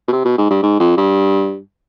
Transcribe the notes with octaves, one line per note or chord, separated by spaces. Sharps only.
B2
C3
B2
G#2
G2
G#2
F2
G2